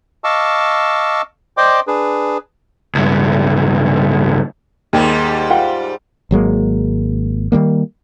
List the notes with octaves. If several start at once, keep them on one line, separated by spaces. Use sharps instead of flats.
D#5 F5 A5 C#6 D6 E6
C5 D5 D#5 G5 C6 D6
D4 G#4 B4
C#2 G2
D#2 G#2 G3 G4
F4 F#5 G5
G#1 F#3 G#3 A#3
D#3 F#3 G3 A#3